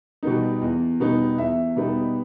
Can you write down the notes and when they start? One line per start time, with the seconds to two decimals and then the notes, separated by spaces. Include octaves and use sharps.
0.23 B2 G3 B3 D#4
0.62 E2
1.00 B2 G3 B3 D#4
1.38 E2 E5
1.76 B2 G3 B3 D#4